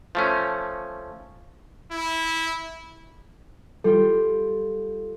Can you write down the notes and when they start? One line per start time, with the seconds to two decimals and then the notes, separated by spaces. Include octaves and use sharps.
0.15 F3 A3 C#4
1.91 E4
3.84 G3 F4 G4 A4